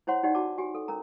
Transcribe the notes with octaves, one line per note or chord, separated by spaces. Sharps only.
E4 C5 C#5 F#5 C6
D#4 G4 D5 F#5
F#4 G4 A5 D6
F#4 G4 G#5
A4
C#4 A#4 A#5